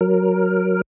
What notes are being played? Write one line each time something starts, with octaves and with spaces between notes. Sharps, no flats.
F#3 A#4